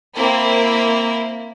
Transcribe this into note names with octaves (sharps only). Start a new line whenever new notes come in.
A#3 C4 E4